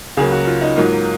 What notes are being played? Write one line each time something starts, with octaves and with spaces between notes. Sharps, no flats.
C#2 C#3 F#3 A#3 G#4
F#4
F4
D#4
G#2 F#3 A#3 F4